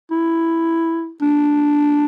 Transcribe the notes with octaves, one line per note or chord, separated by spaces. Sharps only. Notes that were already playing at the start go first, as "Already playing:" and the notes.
E4
D4